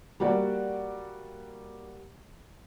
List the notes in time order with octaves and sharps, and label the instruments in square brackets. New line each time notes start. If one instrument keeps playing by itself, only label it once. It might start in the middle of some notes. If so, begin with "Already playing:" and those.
[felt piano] G3 A#3 F#4 D5 F#5